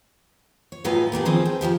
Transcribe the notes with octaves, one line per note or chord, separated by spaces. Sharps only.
C#5
A2 F#3 D#4 F4 B4 G#5
A3 A#3 D4 G4
D#3 F3 C4 G#4 B4
G5
F2 C3 F3 G4